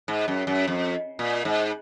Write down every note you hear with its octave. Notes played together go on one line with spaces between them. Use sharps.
G#2
F#2
F#2
F2
A#2
G#2